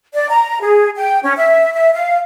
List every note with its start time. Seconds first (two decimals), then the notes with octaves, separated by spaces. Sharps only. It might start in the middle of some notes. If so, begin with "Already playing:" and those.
0.14 D5
0.30 A#5
0.62 G#4
0.97 G5
1.22 C#4
1.37 E5
1.74 E5
1.93 F5